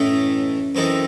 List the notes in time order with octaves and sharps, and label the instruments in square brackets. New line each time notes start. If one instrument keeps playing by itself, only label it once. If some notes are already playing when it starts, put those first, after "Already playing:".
Already playing: [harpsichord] A2 E3 A3 D#4 A4 [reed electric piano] C#4
[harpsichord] F#2 E3 C4 D#4 A4